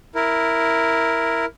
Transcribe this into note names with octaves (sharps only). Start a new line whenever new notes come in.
E4 A#4